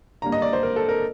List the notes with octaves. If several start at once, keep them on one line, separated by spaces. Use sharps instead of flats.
D3 G3 A#3 A#5
D#5
D5
C5
A#4
A4
A#4